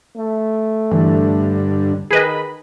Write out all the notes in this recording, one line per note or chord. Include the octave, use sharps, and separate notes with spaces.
A3
G2 D3 E3
D#3 G#4 B4 D#5 B5